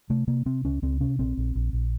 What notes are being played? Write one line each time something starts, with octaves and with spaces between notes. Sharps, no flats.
C3 A3
C3 A#3
C3 C4
C#2 C#4
C#2 C4
C3 C#4
A#1 C4
A#1
A#1
A#1